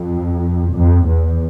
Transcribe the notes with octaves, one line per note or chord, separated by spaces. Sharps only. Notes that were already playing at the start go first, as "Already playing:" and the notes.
Already playing: F2
F2
E2